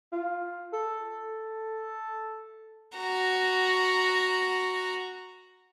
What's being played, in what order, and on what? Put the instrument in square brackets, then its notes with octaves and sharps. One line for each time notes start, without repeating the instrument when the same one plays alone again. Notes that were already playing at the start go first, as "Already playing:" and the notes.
[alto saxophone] F4
A4
[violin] F#4 A#5